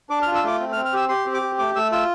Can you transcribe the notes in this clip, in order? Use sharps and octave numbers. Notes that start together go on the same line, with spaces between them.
D4 D6
F6
F4
E6
A3 D6
C4
F6
C4
F6
G4 E6
G4 C6
C4
D6
G4
A3 D6
A3 E6
F4 E6